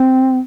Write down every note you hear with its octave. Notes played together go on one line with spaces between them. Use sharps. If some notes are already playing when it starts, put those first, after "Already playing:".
Already playing: C4